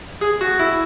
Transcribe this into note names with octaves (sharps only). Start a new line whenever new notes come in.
G#4
F#4
E4